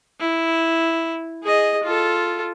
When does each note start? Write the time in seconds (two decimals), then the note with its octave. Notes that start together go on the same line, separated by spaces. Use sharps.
0.20 E4
1.43 G#4 D#5
1.83 F4 A4